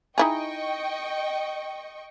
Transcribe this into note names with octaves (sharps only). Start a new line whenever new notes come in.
D#4 E4 G#4 D#5 G5 C#6